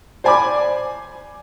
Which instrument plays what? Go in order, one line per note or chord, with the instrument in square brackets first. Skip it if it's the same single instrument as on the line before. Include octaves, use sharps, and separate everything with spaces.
[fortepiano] C5 D5 G#5 B5 D6